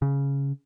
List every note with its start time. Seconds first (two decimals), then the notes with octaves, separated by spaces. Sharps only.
0.02 C#3